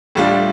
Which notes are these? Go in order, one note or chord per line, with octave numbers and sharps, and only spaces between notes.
A2 G3 D4 F4